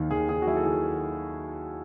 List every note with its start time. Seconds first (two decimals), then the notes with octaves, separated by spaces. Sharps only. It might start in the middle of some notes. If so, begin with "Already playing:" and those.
Already playing: D#2 D#3
0.11 D#2 G#4
0.29 D#3 G#4
0.42 F#4
0.47 F#3 E4
0.56 A4
0.65 D#3 G#4